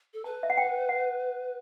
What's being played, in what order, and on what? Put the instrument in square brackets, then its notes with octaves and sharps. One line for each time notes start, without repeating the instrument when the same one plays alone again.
[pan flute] A4
[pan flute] B4 [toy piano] A5
[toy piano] E5
F#5
G5
F#5